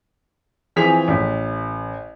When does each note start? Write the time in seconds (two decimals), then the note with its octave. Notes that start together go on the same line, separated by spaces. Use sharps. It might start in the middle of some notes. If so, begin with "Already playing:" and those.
0.76 E3 F3 C4 G#4 B6 F7
1.08 A1